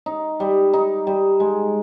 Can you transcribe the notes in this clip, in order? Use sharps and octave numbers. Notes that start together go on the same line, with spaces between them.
D#4
G3
D#4
G3
G#3